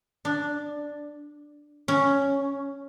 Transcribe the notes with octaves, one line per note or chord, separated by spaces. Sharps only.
D4
C#4